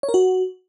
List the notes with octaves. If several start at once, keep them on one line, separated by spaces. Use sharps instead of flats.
C#5
A#4
F#4